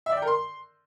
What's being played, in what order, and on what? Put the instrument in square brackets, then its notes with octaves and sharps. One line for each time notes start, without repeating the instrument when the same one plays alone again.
[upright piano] E5
D5
G5
A#4
C6